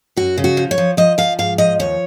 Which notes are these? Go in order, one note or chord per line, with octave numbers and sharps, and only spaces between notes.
F#2 F#4
C#3
F#4
F3
C#5
F3
F3 D#5
F3 F5
G#2 F5
F3 D#5
D#2 C#5